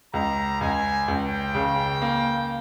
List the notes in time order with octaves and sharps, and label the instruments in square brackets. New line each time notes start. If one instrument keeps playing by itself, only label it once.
[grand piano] C#2 [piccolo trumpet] A#5
[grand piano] C#2 [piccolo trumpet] G#5
[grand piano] C#2 [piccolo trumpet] G5
[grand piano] C#3
A#3